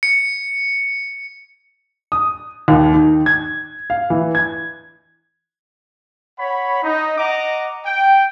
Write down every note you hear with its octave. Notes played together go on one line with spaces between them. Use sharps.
C#7
D#6
D#2
D#3
G#6
F5
E3
G#6
C#5 F#5 B5
D#4
D#5 F#5 A#5 D6
G5